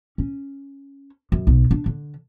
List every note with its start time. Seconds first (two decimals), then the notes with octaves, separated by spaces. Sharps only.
0.18 C#4
1.32 F#2
1.47 B1
1.71 D4
1.86 D3